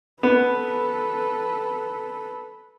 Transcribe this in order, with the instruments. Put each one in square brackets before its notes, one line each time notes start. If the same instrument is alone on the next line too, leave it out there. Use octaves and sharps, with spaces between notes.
[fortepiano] B3 [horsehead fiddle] A4 B4